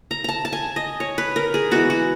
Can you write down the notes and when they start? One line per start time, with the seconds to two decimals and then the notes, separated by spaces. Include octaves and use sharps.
0.11 A#5
0.24 A5 A#5
0.45 A5
0.53 G#5
0.76 D#5
1.00 C#5
1.18 B4
1.36 A#4
1.54 G#4
1.71 E3 G#3 B3 F#4
1.90 F#4